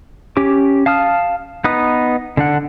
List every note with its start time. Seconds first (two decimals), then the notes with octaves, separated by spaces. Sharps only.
0.37 C#4 G4 D6
0.86 F5 A5 D#6 F6
1.64 B3 D#4 B4 D#6
2.37 D3 D4 F#5